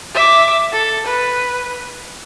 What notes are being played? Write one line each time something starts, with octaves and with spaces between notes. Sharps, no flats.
E5 D6
A4
B4